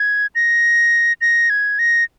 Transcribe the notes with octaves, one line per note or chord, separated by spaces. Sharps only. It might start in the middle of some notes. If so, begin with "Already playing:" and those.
Already playing: G#6
A#6
A#6
G#6
A#6